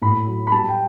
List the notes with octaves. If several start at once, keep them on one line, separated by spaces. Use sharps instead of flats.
A2 B5
F#3
B5
G3 A5
G5